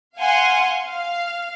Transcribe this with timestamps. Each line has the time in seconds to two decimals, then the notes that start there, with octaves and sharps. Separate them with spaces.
0.17 F5 F#5 G#5 C6
0.87 F5